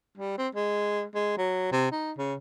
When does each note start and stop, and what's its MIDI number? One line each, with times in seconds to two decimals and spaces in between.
0.18 0.36 55
0.38 0.48 60
0.55 1.04 56
1.15 1.34 56
1.38 1.69 54
1.72 1.90 48
1.92 2.12 63
2.18 2.35 49